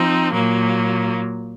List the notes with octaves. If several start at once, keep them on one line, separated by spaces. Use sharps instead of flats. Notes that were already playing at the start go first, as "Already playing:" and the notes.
Already playing: F3 C4 D#4
A#2 F#3 A#3